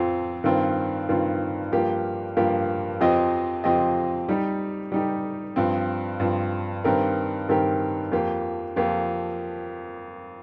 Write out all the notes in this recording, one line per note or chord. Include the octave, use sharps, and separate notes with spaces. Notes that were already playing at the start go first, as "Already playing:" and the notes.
Already playing: F2 F3 C4
G2 D#3 C4 F4
G2 D#3 C4 F4
G2 F3 A#3 G4
G2 F3 A#3 G4
F2 F3 C4 G4 D#5
F2 F3 C4 G4 D#5
G3 D#4 G4
G3 D#4 G4
G2 F3 C4
G2 F3 C4
G2 D#3 C4 G4 A#4
G2 D#3 C4 G4 A#4
F2 F3 A#3 G4
F2 F3 A#3 G4